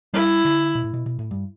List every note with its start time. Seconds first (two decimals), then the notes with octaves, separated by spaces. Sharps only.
0.13 G3 E4
0.45 D3
0.75 B2
0.84 A2
0.94 B2
1.06 B2
1.19 A2
1.31 G2